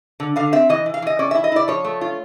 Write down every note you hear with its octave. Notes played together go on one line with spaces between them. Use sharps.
D3
D3 F5
C4 E5
E3 D#5
E3
F5
E3 D#5
C#4 D5
E4 E5
D#5
E4 D5
F3 C#5
A3
F4